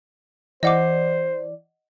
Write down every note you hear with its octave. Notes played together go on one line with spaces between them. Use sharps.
E3 C5 D5 D#5 F#5 D6